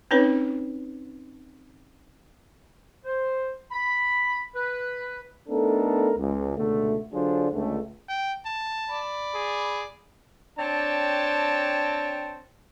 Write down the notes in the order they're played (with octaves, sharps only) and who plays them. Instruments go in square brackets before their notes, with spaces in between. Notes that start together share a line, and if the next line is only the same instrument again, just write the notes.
[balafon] C4 C#4 D#4 B4 C#5
[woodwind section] C5
B5
B4
[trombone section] A3 B3 D4 D#4 A4 A#4
C#2
C#2 B2 D3 A3
D3 F#3 D4 F4 G#4 C5
C#2 D3 A3
[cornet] G5
A5
[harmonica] D5 B5
[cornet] G#4
[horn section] C4 D4 C#5 G5 A5